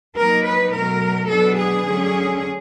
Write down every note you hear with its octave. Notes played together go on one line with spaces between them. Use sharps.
F#3 A#3 D#4 A#4
B4
B2 F#3 A3 A#4
B2 F#3 B3 D4 A4
G#4
D3 F#3 A3 C#4